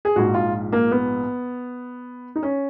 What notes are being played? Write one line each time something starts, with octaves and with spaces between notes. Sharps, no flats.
G#4
A#1 G#2 F3 F#4
F4
A#3
B3
D#4
C#4